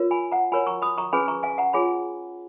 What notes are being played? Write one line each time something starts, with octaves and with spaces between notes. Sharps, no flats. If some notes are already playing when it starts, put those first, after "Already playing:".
Already playing: F4 A#4 C#5
G#5 B5
F#5 A#5
F#4 A#4 C#5 G#5 B5
A#5 C#6
B5 D#6
A#5 C#6
C#4 G#4 B4 G#5 B5
A#5 C#6
F5 G#5
F#5 A#5
F4 G#4 C#5 G#5 B5